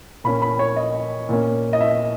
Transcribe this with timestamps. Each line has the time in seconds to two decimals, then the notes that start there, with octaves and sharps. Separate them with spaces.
0.24 A#2 A#3 C#4 B5
0.42 B5
0.59 C#5
0.76 D#5
1.29 A#2 A#3 C#4
1.73 D#5
1.81 E5